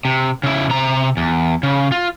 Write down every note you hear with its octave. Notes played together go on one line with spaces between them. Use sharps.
C3
C#3 E4
C3 A#5
E2
C#3
F4